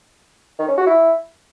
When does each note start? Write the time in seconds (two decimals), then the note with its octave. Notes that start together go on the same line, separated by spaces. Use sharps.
0.59 D#3
0.68 C#4
0.77 F#4
0.87 E4